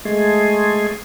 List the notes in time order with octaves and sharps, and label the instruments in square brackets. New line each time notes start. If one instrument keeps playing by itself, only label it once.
[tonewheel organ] G#3 A3 G#4